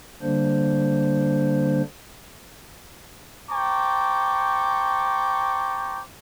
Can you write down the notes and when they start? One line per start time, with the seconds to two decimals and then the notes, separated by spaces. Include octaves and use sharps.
0.22 D3 G3 A#3 D4 C5
3.51 C5 G5 A5 A#5 C#6 D6